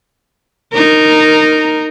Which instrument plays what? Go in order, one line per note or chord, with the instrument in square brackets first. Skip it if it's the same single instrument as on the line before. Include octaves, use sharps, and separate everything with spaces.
[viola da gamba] D#4 A#4